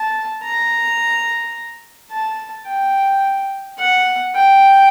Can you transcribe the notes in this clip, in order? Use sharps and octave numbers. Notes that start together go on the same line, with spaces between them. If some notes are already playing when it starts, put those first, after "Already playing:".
Already playing: A5
A#5
A5
G5
F#5
G5